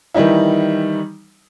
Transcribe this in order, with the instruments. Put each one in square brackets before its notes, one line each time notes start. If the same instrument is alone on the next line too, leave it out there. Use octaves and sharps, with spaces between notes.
[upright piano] D#3 E3 G3 D#4 E4